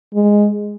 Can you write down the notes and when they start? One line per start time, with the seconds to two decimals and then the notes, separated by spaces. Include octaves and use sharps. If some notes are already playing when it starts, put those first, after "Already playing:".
0.14 G#3